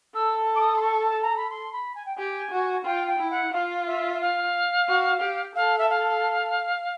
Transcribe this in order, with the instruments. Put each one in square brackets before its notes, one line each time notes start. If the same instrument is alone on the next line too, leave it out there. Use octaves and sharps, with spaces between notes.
[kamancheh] A4 [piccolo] E6
[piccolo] D6
D#6
C6
C#6
A5
A#5
B5
C6
B5
G#5
G5
[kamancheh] G4 [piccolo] G#5
[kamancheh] F#4
[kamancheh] F4 [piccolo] G5
[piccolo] G5
[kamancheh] E4
[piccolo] F#5
[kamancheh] F4 [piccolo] F5
[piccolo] E5
E5
F5
[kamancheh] F#4
G4
[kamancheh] A4 [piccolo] F5
[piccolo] E5
F5